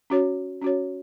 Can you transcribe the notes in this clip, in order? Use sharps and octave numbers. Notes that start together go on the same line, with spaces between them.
C#4 F#4 C#5
C#4 F#4 C#5